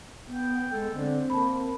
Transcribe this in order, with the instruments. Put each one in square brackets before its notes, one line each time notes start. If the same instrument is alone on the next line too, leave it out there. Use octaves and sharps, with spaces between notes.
[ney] B3 [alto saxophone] G5
[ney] G#3 [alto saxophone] A4
[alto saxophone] D3 [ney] C4
[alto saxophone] A#3 [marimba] A5 B5